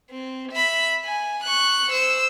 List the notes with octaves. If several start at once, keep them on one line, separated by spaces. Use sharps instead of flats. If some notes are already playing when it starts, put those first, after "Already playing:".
C4
E5 B5
G#5
C#6 F#6
C5 E6